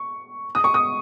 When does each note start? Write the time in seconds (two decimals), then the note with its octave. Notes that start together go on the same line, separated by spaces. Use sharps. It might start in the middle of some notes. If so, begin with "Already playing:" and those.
Already playing: C#6
0.55 D#6
0.64 C#6
0.74 D#6